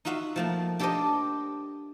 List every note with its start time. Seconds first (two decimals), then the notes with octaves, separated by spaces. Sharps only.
0.05 D#4 F4 F#4 E5 F5
0.36 F3 A3 A#3
0.79 D4 G4 A4 A#4 C5 D#5